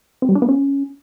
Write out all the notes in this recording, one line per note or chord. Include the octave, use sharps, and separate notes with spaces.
C4
G3
D4
B3
C#4